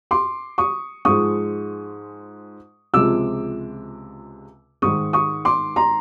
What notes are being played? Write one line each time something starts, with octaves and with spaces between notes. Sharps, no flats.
C6 D6
C#6 D#6
G#2 F3 G#3 C#6 D#6
C#2 C3 F3 G#3 D6 E6
G#2 D#3 G#3 C#6 D#6
C#6 D#6
C6 D6
A#5 C6